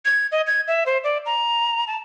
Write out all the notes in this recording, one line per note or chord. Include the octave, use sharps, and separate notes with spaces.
G#6
D#5
G#6
E5
C5
D5
A#5
A5